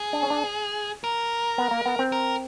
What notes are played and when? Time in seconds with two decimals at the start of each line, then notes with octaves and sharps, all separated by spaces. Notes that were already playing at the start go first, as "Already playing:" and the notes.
Already playing: G#4
0.13 D4
0.23 C#4
0.30 D4
1.04 A#4
1.58 B3
1.71 A#3
1.86 B3
1.99 C4
2.12 A#4